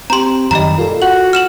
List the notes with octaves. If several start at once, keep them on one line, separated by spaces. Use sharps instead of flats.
C4 G4 A#5 C6
F#2 D#3 G3 D#5 A#5
A#2 F4 A4
F#4 F#7
F6 E7 F#7